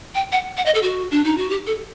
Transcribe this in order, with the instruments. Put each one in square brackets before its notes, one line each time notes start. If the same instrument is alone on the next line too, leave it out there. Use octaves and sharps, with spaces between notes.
[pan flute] G5
F#5
F#5
D#5
A4
F#4
D4
D#4
F#4
G4
A4